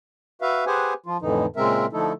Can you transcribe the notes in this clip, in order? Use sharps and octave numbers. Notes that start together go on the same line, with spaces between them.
F#4 B4 E5 F5
G4 G#4 B4 C5 F#5 G#5
F3 F4
F2 A2 D3 E3 D#4
A#2 C#3 G#3 C4 A#4 E5
D3 F3 A3 D#4 E4 A4